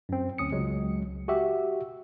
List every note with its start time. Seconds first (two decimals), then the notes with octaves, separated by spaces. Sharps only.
0.09 F#2 C4
0.38 D2 C#4 D#6 C#7
0.52 C#2 F#3 G#3
1.28 F#4 G4 E5